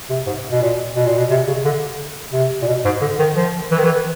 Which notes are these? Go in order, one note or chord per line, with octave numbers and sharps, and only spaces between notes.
C3
G#2
B2
A#2
B2
A#2
B2
C3
C#3
D3
C3
A#2
B2
G#2
D3
D#3
F3
E3
D#3
E3